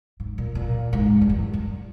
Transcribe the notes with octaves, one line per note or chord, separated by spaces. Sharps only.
G#2
A#2
A#2
G#2
G2
E2
G2